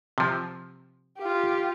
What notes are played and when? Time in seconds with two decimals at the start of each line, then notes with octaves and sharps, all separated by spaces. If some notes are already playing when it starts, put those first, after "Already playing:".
0.18 C3 F3
1.18 F4 G4